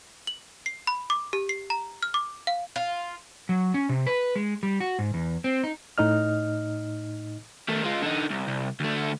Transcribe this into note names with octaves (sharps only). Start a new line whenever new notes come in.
F#7
C7
B5
D6
G4
C7
A#5
F6
D6
F5
F4
F#3
C#4
C3
B4
G#3
G3
F#4
G#2
E2
C4
D#4
A2 D#4 D#5 F6
D#3 A3
G#3 F4
D3 D#4
C2
C2
D2 A3